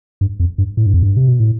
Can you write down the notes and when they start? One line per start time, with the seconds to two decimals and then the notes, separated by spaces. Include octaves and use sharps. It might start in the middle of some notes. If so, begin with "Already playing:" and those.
0.21 G2
0.40 F2
0.58 G2
0.77 A2
0.86 G2
0.94 F2
1.03 G2
1.17 C3
1.28 B2
1.40 A2